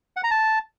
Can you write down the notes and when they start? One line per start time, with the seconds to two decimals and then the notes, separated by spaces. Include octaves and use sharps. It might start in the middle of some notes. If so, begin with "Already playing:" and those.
0.17 F#5
0.24 A#5
0.31 A5